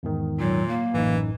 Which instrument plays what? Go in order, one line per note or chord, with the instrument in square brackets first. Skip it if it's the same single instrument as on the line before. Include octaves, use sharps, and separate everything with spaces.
[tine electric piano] E2 G#2 D#3
[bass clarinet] A#2 [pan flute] F#3
[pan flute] A#3
[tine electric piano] A1 F#2 D#4 [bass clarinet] E3